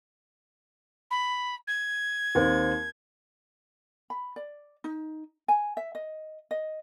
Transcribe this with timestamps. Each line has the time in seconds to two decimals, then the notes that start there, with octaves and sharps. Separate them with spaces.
1.11 B5
1.67 G#6
2.35 D#2 C4
4.10 B5
4.36 D5
4.84 D#4
5.48 G#5
5.77 E5
5.95 D#5
6.51 D#5